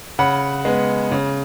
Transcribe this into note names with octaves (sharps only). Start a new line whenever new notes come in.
C#3 F#5 B5
G#3 B3
C#3